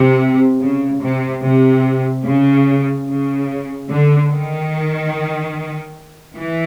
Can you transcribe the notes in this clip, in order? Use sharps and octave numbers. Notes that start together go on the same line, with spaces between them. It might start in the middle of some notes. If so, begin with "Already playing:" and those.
Already playing: C3
C#3
C3
C3
C#3
C#3
D3
D#3
E3